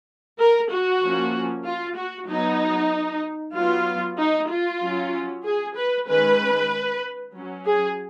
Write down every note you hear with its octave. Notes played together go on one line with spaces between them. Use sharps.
A#4
F#4
F3 A#3 C#4
F4
F#4
F#3 B3 D#4
F#3 B3 F4
D#4
F4
F#3 C#4
G#4
B4
D#3 G#3 C#4 B4
F#3 C#4
G#4